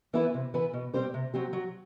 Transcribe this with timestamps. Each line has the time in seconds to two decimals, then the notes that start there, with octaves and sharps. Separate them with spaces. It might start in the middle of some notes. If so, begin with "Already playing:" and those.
0.13 E3 B3 E4 B4
0.34 C3
0.54 E3 B3 E4 B4
0.73 B2
0.94 G3 C4 G4 C5
1.14 C3
1.34 F#3 C4 G4
1.53 F#3